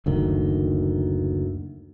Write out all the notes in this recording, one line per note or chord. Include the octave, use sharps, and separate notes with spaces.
F#1 D2 D#3